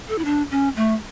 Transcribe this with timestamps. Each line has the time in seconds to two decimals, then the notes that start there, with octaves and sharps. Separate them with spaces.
0.09 A4
0.19 E4
0.25 D4
0.51 C#4
0.76 A3